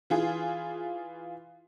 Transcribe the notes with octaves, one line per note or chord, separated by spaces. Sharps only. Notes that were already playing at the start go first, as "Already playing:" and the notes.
E3 F4 G#4